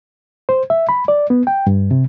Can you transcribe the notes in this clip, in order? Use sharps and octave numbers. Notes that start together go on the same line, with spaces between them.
C5
E5
B5
D5
B3
G5
G2
C3